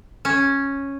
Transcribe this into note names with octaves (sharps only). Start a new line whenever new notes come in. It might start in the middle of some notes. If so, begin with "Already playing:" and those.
C#4